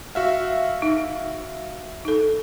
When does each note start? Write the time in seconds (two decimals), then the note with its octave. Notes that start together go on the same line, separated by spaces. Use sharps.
0.15 F#4 E5 F5
0.82 D#4
2.05 D#4 A4